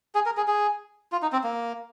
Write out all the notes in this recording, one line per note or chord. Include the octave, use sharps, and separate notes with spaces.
G#4
A#4
G#4
G#4
F4
D#4
C4
A#3